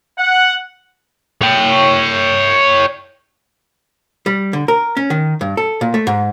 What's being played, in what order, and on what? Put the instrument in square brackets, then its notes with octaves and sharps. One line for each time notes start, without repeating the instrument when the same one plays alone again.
[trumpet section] F#5
[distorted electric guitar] C#5 G5
[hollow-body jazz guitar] G3
D3
A#4
C#4
D#3
G2
A4
A#2
A3
G#2